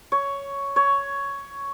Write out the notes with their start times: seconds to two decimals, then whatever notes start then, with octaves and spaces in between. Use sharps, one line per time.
0.12 C#5
0.76 C#5